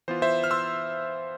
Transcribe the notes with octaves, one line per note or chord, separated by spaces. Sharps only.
E3 B3 F4 C5
C5 E5
F6
C6 E6